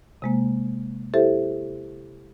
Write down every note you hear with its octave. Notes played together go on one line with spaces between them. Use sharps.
C3 G#3 A#3
E4 G4 A4 C5 E5